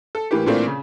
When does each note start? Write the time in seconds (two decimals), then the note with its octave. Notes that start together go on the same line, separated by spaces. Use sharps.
0.15 A4
0.31 A2 E3 A#3 G4
0.46 A#2 E3 A3 A#3 C4 D4
0.67 C#3